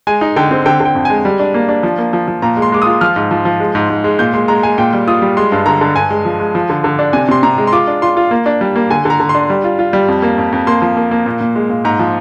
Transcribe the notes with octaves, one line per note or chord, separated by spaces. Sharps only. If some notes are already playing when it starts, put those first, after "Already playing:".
G#3 G#5
D#4
D3 G5
C4
D3 G5
D3 G5
F2
G#3 G#5
G3
D4
A#3
D4
F3
A#3
F3
F3
A#2 A#5
G#3
C6
G#3 D6
F4 D#6
F3 F6
G#2
F3
F3
G#3
G#2
G#2
G#3
A#2 G6
G#3 C6
G#3 A#5
G#3 G#5
A#2 G5
G3
F4 D#6
G3
G#3 C6
G2
D3 A#5
D3
G2 G#5
G#3
F3
G#3
F3
D3
D3
D4
C3 G#5
C3 C6
C3 A#5
G#3
C6
F4 D6
D4
F4 C6
F4
A#3
D4
G3
A#3
D3 G#5
D3 A#5
D3
C6
D4
G3
F4
F4
G3
F2
A#3
F2
F2
A#3 C6
F3
A#3
A#3
A#2
A#2
G#3
A#2
G#2 A#5
F3